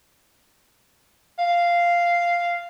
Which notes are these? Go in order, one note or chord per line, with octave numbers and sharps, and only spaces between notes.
F5